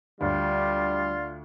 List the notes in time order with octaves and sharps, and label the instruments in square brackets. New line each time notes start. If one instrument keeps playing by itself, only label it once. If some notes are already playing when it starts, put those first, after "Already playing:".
[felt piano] D2 [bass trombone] G3 [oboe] F4 [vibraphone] D5